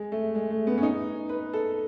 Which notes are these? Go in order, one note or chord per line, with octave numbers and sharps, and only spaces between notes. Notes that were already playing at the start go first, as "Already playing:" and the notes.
Already playing: G#3
A3
G#3
A3
B3
C#4
D#4
B4
A4